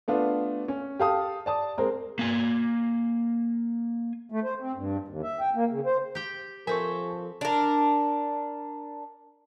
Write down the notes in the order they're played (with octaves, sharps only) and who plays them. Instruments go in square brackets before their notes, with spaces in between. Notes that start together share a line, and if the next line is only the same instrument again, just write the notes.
[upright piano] A3 B3 D4 F4
C#4
G4 A4 F5 A5 D#6
D5 A5 D#6
G#3 C4 A#4
[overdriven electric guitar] A#3 G#5
[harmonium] A3
C5
C4
G2
D#2
E5
G5
A#3
C#3
C5
[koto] G4 G5
[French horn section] F3 A4 [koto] C4 E5 [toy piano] A#4 [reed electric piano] G#5 C#6
[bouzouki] D4 A#4